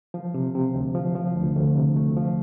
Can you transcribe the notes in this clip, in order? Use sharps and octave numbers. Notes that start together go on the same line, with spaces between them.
F3
C3
C3
D2
F3
F3
D2
D2
C3
A3
F3